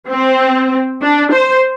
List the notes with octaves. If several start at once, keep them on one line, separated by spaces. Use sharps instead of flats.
C4
D4
C5